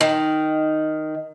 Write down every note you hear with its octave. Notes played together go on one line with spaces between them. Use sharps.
D#3